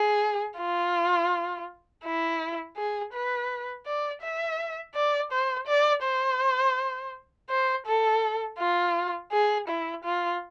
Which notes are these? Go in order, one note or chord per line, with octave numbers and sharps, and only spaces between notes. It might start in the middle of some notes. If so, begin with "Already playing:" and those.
Already playing: G#4
F4
E4
G#4
B4
D5
E5
D5
C5
D5
C5
C5
A4
F4
G#4
E4
F4